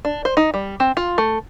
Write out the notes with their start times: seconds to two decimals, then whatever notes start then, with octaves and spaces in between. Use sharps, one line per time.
0.05 D4
0.25 C5
0.37 D#4
0.54 G3
0.80 C4
0.97 F4
1.18 A3